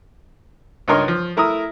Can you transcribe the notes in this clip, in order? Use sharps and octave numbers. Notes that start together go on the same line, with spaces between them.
C#2 G2 D#4 A#4 C#5 C6
F3
A3 E4 A#4 A#5 D#6